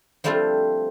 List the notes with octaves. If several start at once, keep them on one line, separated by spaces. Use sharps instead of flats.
F3 G3 A3 C4 D4 F4